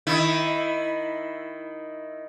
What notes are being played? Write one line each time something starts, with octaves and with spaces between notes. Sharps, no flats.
D#3 E4